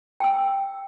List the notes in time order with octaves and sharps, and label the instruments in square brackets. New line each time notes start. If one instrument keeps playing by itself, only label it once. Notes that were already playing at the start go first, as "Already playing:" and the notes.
[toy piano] G5 E6